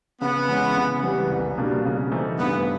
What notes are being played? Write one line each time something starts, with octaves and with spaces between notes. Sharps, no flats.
C#3 B3
E3 G#3 C#4
C#3
E3 G3 B3
C2
B2 G3 A#3 D4
C#3
E3 A3 C4 D#4
G2 B3